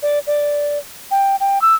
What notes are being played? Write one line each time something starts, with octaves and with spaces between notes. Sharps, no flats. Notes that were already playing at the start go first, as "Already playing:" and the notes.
D5
D5
G5
G5
E6